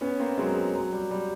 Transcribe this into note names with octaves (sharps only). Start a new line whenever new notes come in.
B3 C#4
A#3 C4
F#3 G#3
F#3
G3
G3